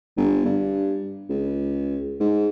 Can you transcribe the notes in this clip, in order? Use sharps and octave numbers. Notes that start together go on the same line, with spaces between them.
G1
G2
C#2
G#2